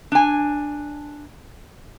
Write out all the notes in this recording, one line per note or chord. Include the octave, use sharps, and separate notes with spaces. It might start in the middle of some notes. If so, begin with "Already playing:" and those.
D4 G#5